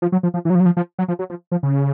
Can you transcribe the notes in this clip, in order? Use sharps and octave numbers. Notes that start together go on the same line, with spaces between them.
F3
F#3
F3
F3
E3
F#3
F3
F#3
F3
F3
F#3
F3
F#3
F3
F3
C#3